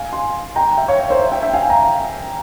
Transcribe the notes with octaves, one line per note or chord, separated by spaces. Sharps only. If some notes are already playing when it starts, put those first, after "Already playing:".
Already playing: F5 G#5
G#5 C6
G5 A#5
E5 G5
C#5 F5
C#5
C5 E5
E5 G5
E5 G5
F5 G#5
G5 A#5